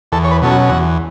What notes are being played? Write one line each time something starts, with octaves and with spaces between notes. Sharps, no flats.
E2 A4
C#5
B4
B2 F#3 C#4 A4
F#4
E2 F#4